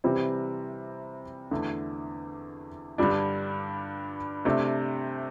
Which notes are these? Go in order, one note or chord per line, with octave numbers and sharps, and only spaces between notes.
C3 E3 G3 C4 G4
E2 D3 A3
G2 D3 G3 D4
C3 A3 D4 G4